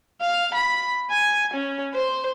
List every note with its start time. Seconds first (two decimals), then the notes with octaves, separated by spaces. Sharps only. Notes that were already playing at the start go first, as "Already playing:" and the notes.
0.20 F5
0.54 B5
1.10 G#5
1.53 C#4
1.94 C5